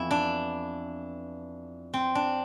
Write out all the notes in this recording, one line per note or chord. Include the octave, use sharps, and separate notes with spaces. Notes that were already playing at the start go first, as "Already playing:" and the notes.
Already playing: F2 E3 B3 E4
D4
C4
D4